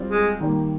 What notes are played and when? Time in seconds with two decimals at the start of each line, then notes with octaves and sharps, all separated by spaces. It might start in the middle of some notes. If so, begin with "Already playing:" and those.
Already playing: G3 C4 F4
0.10 G#3
0.40 D#3 G3 A#3